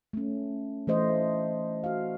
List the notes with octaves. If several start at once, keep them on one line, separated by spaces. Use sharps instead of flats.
A3 C#4
E3 A3 C5 D#5
F#4 F5